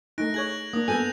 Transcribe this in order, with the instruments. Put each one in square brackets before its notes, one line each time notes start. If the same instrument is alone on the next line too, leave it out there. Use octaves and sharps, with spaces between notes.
[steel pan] A3 D#4 [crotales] F#6 A#6 D7
[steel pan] G#4 C#5 [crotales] F#6 G#6 F#7
[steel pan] A#3 D4 [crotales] D#6
[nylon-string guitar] B3 G#5 [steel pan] A4 [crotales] D#6 G6 F7